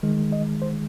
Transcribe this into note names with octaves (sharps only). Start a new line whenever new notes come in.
D#3 G#3
D#5
C5